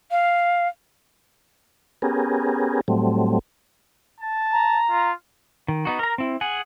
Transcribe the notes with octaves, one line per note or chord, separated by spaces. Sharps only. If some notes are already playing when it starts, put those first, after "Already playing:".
F5
B3 C#4 G4 G#4 A#4
A2 F#3 G3 A3 C4
A5
A#5
F4
D#3
B3 D#4 F#4
A#4 A#5
C4 E4
G#4 F#5 G#5